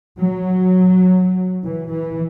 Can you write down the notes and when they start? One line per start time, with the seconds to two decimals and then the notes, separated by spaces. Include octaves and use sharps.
0.20 F#3
1.64 E3
1.93 E3